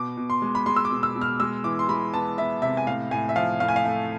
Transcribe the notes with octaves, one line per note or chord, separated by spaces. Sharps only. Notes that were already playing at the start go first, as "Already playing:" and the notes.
Already playing: B2 D6
B2
C6
G#3
B5
G#3 C6
E6
D6
B2
E6
B2
F6
G#3 E6
E3 D6
C6
G#3 B5
B3 A5
B3 E5
C3 E5
G#5
A2 F5
A2 G#5
E5
F3 F5
A2 F5
G#5
F5
A3